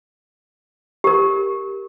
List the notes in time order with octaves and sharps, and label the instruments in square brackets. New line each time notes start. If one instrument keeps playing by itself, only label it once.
[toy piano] G4 A#4